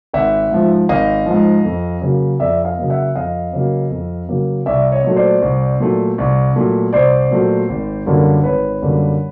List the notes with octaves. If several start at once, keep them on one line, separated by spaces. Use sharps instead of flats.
G#1 E5 F#5
G#2 F3
G#1 D#5 F5
G#2 F3
F2
C#3 F#3 A#3
F2 D5 E5
D#5 F5
C#3 F#3 A#3
E5 F#5
F2 D#5 F5
C#3 F#3 A#3
F2
C#3 F#3 A#3
C2 D5 E5
C#5 D#5
A#2 F#3 A3
C5 D5
C2
A#2 F#3 A3
C2
A#2 F#3 A3
C2 C5 D5
A#2 F#3 A3
G#1
F#2 D3 G3 A#3
G#1 B4 C#5
F#2 D3 G3 A#3